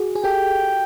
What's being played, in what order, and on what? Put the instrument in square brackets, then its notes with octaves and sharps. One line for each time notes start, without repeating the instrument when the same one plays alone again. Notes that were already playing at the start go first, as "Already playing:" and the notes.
Already playing: [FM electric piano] F#4 G#4
G#4
[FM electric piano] G4 A4 [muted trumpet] G5